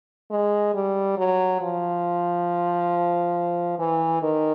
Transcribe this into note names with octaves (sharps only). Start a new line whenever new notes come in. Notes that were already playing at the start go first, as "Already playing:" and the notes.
G#3
G3
F#3
F3
E3
D#3